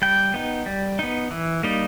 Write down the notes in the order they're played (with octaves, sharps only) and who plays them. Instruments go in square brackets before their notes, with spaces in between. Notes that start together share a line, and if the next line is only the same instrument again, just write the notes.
[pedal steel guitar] G3 G5
B3 D#4
G3
B3 D#4
E3
G3 A#3 D#4